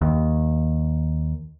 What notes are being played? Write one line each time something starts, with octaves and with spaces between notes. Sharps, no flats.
D#2